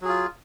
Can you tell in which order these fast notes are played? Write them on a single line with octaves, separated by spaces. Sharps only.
F#3 G#4 F4